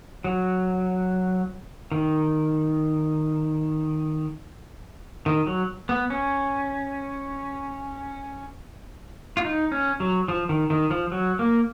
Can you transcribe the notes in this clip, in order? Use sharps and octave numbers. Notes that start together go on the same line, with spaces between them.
F#3
D#3
D#3
F#3
B3
C#4
F4
D#4
C#4
F#3
F3
D#3
D#3
F3
F#3
A#3